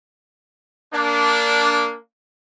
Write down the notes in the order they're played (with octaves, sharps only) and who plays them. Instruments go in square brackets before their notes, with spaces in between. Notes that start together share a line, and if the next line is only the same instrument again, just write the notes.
[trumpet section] A#3 D4